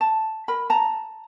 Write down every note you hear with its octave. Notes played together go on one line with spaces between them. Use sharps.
A5
A#4 B5
A5 A#5